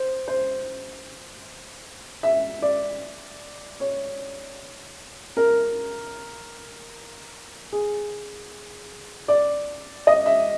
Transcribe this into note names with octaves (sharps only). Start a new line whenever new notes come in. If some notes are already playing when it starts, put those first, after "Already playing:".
Already playing: C5
C5
E5
D5
C#5
A#4
G#4
D5
D#5
E5